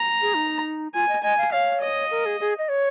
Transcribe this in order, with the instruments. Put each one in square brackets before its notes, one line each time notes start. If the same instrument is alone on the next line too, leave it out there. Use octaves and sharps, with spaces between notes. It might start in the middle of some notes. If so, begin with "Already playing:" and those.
Already playing: [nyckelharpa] A#5
[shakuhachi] G#4
D#4
[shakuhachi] F4 [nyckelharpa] G#5
[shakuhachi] D#5
[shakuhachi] D#5 [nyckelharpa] G#5
[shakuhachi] F5
[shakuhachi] C#5 [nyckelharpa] F5
[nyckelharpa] D#5
[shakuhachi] A#4
G#4
G#4
D#5
C#5